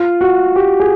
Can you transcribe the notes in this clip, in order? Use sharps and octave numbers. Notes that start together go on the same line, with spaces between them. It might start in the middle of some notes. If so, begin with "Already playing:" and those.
Already playing: F4
F#4
G4
G#4